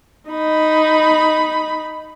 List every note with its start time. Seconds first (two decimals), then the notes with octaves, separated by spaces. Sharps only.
0.30 D#4 B5